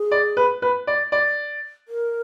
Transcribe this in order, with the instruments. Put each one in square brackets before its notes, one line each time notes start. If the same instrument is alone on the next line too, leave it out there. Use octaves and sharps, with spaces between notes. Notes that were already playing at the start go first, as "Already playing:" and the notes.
Already playing: [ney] G#4
[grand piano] D5
B4
B4
D5
D5
[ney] A#4